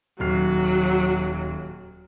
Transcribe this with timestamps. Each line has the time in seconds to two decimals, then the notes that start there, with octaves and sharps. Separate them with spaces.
0.20 D#1 F#3 F6 C7